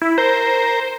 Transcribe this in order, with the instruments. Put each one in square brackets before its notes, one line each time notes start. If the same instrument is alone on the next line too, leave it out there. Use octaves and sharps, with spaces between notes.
[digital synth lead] E4
[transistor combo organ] A#4 [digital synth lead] C5